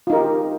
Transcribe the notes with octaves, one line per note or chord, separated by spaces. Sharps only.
D#4 F4 G4 A#4